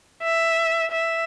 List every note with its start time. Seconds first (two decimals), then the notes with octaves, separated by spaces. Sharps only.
0.24 E5
0.91 E5